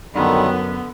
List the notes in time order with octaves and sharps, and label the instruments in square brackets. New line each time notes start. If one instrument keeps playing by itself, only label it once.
[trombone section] F#2 [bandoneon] D3 D#3 G3 [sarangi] B3
[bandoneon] D3